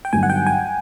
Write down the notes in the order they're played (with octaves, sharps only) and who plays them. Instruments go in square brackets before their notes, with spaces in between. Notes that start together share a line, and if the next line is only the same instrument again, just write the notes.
[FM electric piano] G5
[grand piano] G2 D3 F#3 B3 D#4 [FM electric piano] G#5
[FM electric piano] F#5
G5
G#5